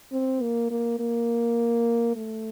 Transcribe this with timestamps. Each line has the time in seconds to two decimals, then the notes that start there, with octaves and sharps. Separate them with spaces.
0.12 C4
0.42 A#3
0.71 A#3
0.99 A#3
2.16 A3